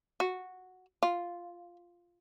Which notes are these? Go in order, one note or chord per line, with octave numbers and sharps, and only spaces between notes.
F#4
F4